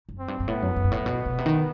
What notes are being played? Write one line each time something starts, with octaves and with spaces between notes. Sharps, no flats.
F#2
C4
G2
G2
A2 B3
F#2
F#2
G2
A2
B2
B2
C3
D#3